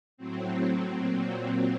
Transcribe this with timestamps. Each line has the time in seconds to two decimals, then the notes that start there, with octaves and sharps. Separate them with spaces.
0.17 A2 F#3 C4
0.92 A#2 F#3 C4